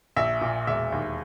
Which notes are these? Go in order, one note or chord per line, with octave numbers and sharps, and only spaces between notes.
A#1 E5
A#2
E1 E5
D#2